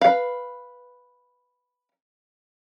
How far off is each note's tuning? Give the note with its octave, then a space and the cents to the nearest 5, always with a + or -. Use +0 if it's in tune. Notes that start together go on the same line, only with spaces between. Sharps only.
B4 +0 F5 +0